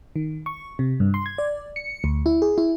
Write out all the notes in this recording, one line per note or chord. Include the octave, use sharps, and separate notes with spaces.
D#3
C#6
C3
G2
C6
G#6
D5
C#7
D2
E4
G#4
E4